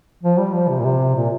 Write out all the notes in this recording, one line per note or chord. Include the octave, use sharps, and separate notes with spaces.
F3
G3
F3
C3
A#2
C3
A#2